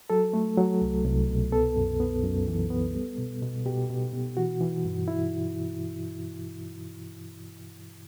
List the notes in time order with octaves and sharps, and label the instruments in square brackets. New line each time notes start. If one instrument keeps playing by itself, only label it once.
[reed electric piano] F#3 A4
A3
F#3
C2
C2
B2
B3 A4
F#2
B3
F#2
E3
B3
G3
B2
B2
B2 G4
B2
B2
E3 F#4
E3
G2
E4